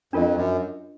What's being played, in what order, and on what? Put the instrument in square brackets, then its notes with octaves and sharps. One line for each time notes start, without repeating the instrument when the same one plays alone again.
[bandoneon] F2 [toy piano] D4 F4 A#4 D#5
[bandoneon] F#2